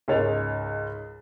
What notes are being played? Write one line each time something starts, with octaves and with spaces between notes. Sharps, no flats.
C#2 G#2 A#4 C#5 A6 F7